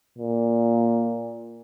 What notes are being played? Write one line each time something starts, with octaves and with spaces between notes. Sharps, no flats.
A#2